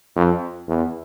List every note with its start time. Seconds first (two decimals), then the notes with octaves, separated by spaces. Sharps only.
0.16 F2
0.68 E2